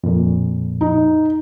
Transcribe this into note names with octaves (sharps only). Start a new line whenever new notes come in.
F2 A#2
D#4